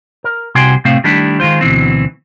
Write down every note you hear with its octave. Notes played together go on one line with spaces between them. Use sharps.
A#4
C2 C3 F#4 G5 G#5 C6
A2 C3 A3 C4 F5
D#3 G3 A3 D4 E4 G4
D#3 G#3 F4 C5
D2 B2 E3 C4